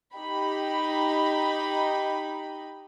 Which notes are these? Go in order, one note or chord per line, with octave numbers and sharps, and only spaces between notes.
D#4 G4 B5